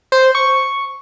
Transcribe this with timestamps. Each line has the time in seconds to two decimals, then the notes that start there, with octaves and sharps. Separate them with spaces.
0.12 C5
0.35 C#6